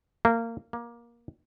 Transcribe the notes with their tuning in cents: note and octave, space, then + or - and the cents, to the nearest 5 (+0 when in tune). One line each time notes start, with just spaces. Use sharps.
A#3 -20
A#3 +20